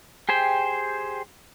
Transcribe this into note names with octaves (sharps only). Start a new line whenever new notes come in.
G4 G#4 C5 G5